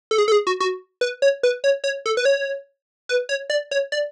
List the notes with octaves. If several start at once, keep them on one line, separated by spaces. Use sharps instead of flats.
A4
G#4
A4
G#4
F#4
F#4
B4
C#5
B4
C#5
C#5
A4
B4
C#5
B4
C#5
D5
C#5
D5